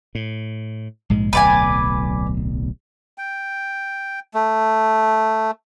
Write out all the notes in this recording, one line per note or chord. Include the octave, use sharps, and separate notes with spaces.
A2
A#1 G#2 G#3
D1 B1 B4 D5 G#5
G5
A3